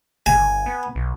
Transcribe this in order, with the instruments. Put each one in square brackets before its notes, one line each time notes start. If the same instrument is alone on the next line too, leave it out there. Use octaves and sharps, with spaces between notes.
[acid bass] G1 [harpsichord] G#5
[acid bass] B3
B1